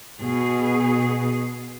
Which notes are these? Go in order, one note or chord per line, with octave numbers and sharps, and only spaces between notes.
B2 G#4